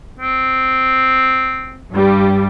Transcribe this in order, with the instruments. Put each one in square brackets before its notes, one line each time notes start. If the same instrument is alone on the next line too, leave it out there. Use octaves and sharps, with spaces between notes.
[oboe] C4
[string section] G2 G3